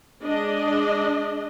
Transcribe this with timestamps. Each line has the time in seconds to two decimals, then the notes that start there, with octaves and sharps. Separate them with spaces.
0.23 G#3 D4 D#5